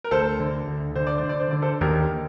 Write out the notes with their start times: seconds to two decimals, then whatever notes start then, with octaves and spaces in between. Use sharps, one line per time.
0.04 A#4
0.11 D2 A4 C5
0.40 D3
0.68 D2
0.96 D3 C5
1.07 D5
1.18 C5
1.24 D3
1.29 D5
1.40 C5
1.51 D3 D5
1.62 A4 C5
1.81 D#2 G4 A#4